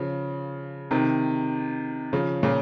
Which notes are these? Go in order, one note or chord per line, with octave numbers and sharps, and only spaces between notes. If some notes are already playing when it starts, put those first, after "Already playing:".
Already playing: C#3 F3
C3 D#3
C#3 F3
A#2 C#3